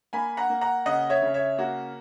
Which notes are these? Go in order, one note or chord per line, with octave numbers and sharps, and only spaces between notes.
A#3 G#5 B5
F#5 A#5
A#3
F#5 A#5
C#3 D#5 F#5
C#5 E5
C#3
C#5 E5
A#3 F#4